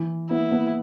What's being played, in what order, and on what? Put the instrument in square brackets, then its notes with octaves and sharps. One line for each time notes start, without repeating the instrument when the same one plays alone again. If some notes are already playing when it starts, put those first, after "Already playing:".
Already playing: [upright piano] E3
[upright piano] B3 [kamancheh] E4
[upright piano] B3